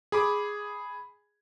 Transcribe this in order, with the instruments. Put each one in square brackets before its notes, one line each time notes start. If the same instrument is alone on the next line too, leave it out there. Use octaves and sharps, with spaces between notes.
[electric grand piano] G#4 B5 D6